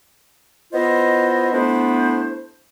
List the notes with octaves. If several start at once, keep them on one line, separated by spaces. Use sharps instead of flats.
B3 E4 F4 C5 D#5
A3 B3 D4 E4 C5